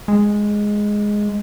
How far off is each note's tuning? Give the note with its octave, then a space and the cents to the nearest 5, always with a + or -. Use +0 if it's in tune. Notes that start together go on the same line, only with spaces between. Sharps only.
G#3 +0